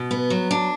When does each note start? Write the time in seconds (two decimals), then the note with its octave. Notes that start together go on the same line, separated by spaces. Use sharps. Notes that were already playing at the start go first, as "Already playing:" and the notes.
Already playing: B2
0.11 B3
0.30 F#3
0.51 D4